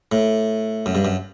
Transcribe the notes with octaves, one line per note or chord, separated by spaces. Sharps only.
A2
F#2
G2
F#2